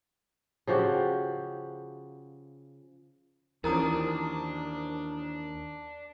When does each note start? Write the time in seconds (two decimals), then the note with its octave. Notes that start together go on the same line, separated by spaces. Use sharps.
0.67 C#3 F3 F#4 G4
3.64 D#2 E3 F3 C#4 D4 A#4 A#5 D#6